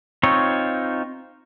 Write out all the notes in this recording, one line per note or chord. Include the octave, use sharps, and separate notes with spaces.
C4 D#4 F4 C#5